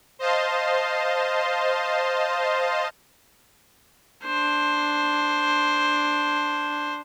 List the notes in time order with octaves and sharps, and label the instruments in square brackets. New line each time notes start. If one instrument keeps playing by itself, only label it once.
[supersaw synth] C5 D#5 F5 A5 C6
[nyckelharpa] D4 C5